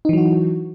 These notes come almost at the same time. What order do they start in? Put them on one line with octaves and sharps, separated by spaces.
D#4 E3 F#3 F#4